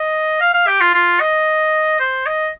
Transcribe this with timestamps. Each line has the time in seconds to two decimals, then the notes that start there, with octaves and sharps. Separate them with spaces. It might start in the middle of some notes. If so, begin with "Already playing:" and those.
Already playing: D#5
0.41 F5
0.54 F5
0.67 G4
0.81 F4
0.94 F4
1.20 D#5
2.00 C5
2.26 D#5